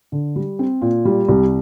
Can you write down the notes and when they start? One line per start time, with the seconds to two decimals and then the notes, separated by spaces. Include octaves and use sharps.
0.12 D3
0.36 G3
0.59 C4
0.82 A#2
1.05 G3
1.28 C2